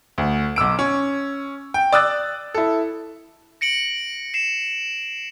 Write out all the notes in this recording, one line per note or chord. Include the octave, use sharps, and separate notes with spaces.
D2
B1 D6 E6 D7
C#4
G5
D5 D#6 E6 F#6 A6
E4 A4
A#6 C#7 D7 F#7
C7 E7